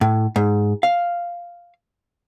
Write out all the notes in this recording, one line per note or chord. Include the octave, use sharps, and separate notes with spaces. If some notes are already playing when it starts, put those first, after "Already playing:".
A2
G#2
F5